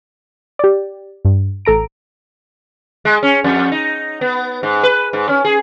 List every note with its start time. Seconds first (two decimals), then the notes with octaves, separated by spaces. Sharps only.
0.59 G4 D5
1.25 G2
1.65 A1 A4 A#5 D7
3.05 G#3
3.23 C#4
3.44 F2
3.72 D#4
4.21 B3
4.63 G#2
4.83 B4
5.13 G#2
5.29 C#4
5.45 G#4